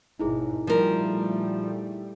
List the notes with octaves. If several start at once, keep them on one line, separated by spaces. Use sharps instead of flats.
G#1 G#2 B2 D#4 E4 G#4
A#2 F3 G3 A3 A#4